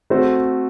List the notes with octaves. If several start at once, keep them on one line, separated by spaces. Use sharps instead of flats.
A3 C4 F#4 C5